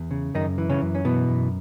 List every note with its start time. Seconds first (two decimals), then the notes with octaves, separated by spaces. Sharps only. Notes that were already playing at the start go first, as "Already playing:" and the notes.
Already playing: E2
0.11 C#3
0.34 F#2 D#3 D#4
0.58 E3
0.70 C#3 C#4
0.82 F#2
0.95 C#4
1.05 B2 E3 B3
1.29 F#2